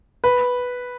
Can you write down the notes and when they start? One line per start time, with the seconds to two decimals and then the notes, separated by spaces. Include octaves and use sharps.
0.24 B4